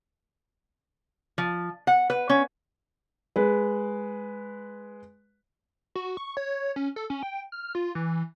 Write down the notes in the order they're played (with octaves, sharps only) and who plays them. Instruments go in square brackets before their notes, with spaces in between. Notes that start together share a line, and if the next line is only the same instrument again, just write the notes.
[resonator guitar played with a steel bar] F3
F#5
B4
C#4
[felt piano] G#3 B4
[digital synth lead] F#4
C#6
C#5
C#4
A4
C#4
G5
F6
F4
E3